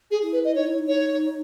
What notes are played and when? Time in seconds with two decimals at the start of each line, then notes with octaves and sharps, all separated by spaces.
0.11 G#4
0.22 E4
0.33 B4
0.45 D#5
0.55 D#4 C#5
0.67 E4
0.79 D#4
0.88 C#5